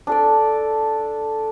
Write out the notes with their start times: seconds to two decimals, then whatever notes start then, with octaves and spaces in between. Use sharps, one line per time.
0.07 D4 A4 D5